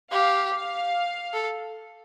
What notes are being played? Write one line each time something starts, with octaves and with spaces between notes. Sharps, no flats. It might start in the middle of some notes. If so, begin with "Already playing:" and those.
G4 F5
F5
A4